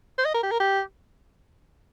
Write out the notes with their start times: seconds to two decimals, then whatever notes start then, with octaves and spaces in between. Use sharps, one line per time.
0.18 C5
0.25 D#5
0.34 A#4
0.43 G4
0.51 A#4
0.60 G4